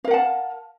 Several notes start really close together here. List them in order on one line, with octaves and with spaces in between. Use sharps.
F5 A#4 F#5 A5